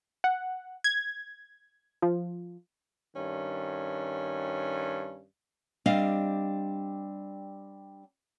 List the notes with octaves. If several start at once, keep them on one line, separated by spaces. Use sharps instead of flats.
F#5
G#6
F3
G2 D#3 C#4
G3 C4 D4 G4 D#5 F5